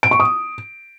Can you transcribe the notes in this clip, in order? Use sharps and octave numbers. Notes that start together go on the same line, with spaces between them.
D7
C#6
D#6